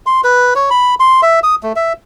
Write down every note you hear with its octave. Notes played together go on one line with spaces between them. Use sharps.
C6
B4
C#5
B5
C6
E5
D#6
A3
E5